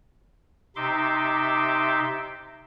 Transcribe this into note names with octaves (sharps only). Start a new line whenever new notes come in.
C3 D#4 E5 C6 D6